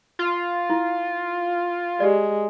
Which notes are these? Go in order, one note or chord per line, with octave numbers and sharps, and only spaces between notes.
F4
E4
G#3 G4 D5